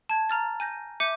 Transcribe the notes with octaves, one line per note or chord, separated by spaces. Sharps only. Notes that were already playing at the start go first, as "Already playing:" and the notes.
A5 G#6
A#5 F6 A6
G#5 G6 A#6
E5 D6 G6 C#7 D#7